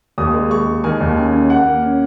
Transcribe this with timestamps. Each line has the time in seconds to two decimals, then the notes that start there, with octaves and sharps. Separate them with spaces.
0.18 D#2 D#6
0.34 G#3
0.51 G#3 C#6
0.67 G#3
0.84 D#3 G#5
1.00 D#2
1.16 C#4 G#5
1.33 C#4
1.50 A#3 F#5
1.66 A#3
1.83 C#4